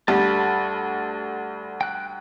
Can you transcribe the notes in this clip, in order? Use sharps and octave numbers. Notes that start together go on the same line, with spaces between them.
D2 G3 A4 D5 B5
G5 F#6